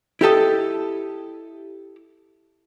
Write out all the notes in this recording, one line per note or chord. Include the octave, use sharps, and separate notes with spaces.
E4 G4 A4 D#5